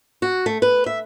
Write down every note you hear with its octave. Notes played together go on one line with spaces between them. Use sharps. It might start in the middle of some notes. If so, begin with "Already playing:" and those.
F#4
A3
B4
E5